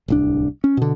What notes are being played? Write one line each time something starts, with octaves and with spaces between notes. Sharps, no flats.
D1 C2 D4
C#4
B2 D3